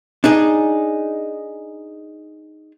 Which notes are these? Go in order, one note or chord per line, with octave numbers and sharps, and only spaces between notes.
D4 D#4 G#4